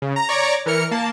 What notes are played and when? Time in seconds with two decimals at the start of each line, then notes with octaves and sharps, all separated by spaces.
0.02 C#3
0.16 A#5
0.29 C#5 D5 A#5 C#6 D6
0.66 E3 A#4 F6 C#7
0.91 A#3 A5